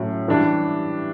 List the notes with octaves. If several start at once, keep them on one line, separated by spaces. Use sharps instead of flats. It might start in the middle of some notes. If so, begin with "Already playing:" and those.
Already playing: A2 F#3 C#4
E3 G3 D4